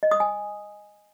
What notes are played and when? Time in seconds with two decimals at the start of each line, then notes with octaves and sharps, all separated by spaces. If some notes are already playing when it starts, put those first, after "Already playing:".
0.03 D#5
0.11 D#6
0.20 G#5